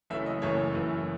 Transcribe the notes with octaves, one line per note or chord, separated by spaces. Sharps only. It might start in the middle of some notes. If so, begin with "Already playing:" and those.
F#1 F#2 E3 A3 E5
D#5
F#1 F#2 E3 A3 C#5
F#1 F#2 E3 A3